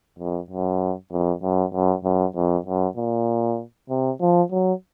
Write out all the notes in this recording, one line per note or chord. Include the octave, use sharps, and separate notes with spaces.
F2
F#2
F2
F#2
F#2
F#2
F2
F#2
A#2
C3
F3
F#3